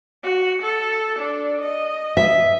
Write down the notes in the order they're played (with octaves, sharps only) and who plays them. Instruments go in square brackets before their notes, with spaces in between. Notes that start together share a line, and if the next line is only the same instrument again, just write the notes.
[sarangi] F#4
A4
D4
D#5
[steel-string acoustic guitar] E5